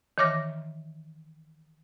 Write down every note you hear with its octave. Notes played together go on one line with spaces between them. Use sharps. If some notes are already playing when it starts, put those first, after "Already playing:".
D#3 E3 C#5 D6 F6 A#6